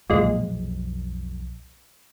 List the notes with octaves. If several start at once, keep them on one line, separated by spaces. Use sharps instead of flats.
B1 F2 A#2 G#3